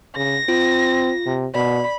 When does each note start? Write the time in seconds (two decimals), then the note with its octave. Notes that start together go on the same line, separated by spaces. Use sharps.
0.16 C#3 A#6
0.48 C4 F4
1.26 C3
1.55 B2 D5 B5